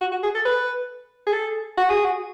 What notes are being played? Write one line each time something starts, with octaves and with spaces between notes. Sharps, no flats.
F#4
F#4
G#4
A4
B4
G#4
A4
F#4
G#4
F#4